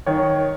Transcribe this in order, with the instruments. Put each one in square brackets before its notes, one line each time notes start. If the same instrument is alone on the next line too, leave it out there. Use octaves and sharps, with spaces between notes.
[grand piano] D#3 C#5